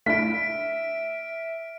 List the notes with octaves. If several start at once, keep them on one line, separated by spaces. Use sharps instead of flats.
A3 D4 E4 E5 F6 B6 D7